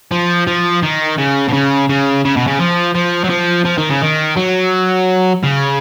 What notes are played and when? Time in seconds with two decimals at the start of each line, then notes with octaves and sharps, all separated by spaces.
0.11 F3
0.47 F3
0.83 D#3
1.18 C#3
1.48 B2
1.53 C#3
1.89 C#3
2.25 C#3
2.37 B2
2.47 C#3
2.60 F3
2.95 F3
3.24 F#3
3.30 F3
3.65 F3
3.78 D#3
3.90 C#3
4.02 D#3
4.36 F#3
5.43 C#3